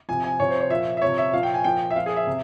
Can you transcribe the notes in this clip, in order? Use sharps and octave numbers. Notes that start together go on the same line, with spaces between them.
C3 F3 G#5
G#5
C3 F3 C#5
C5
C#5
A#2 F3 E5
E5
C3 F3 C#5
E5
A#2 F3 F5
G5
G#5
A#2 F3 G5
E5
A#2 F3 F5
G#4
E5
C3